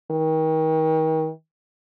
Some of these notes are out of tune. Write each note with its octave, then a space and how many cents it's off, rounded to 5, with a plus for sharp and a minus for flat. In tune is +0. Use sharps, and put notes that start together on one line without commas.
D#3 +35